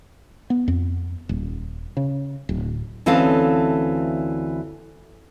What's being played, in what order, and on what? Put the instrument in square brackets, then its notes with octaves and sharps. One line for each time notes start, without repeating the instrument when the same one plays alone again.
[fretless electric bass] B3
F2
D#1
C#3
D1
[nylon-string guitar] D2 E3 C4 C#4 A4 F5